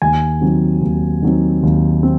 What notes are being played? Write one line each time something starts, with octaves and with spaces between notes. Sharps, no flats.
D#2 G#5
D#3 F#3 C4
D#2
D#3 F#3 C4
D#2
C4